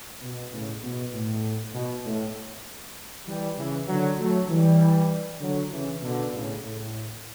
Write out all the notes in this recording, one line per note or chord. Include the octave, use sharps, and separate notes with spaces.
B2
A2 C#3
B2
A2
B2
A2
E3 G3
C#3 E3
D3 F#3
F#3 A3
E3 G3
D3 F#3
C#3 E3
B2 D3
A2 C#3
A2